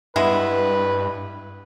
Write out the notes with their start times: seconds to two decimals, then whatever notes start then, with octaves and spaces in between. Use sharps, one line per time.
0.16 G2 G#3 B3 E4 B4